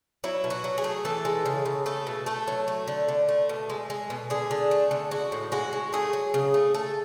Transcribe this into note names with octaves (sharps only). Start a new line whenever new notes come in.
F#3 E4
B2
F#4
F#3
G#4
A3
E3 A4
G#3
C#3
C#3
A3 A4
B2
A3 A4
F#3
A3
D3
D3
A3
B2
G#3
G#3
B2
D3 G#4
D3
A3
D3
G#3 F#4
A2
G#3 F#4
G#3
A3 G#4
F#3
C#3
A3
A3 A4